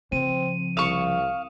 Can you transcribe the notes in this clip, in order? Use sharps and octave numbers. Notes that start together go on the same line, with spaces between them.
C#3 F3 C4 D#7
C2 F5 C#6 D#6 E7